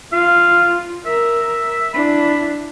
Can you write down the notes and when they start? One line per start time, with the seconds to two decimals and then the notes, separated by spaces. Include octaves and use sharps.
0.12 F4 F5
1.06 A#4 E5
1.94 D4 E4 B5